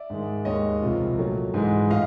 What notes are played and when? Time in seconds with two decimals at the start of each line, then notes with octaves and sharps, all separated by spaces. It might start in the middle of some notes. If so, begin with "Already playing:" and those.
Already playing: D5 E5
0.10 G#2 D#3 G#3
0.45 D#2 D#3 G#3 C#5 D#5
0.82 C2 C3 F3
1.18 A#2 F#3 A3
1.54 G#2 E3 G#3
1.90 A2 D#5 F5